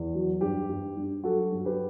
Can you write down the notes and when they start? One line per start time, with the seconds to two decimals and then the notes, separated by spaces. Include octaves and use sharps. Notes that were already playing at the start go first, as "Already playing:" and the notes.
Already playing: E2
0.14 F#3
0.41 G2 G4
0.69 G2
0.97 G2
1.24 F#3 F#4 A4
1.52 G2
1.65 G4 B4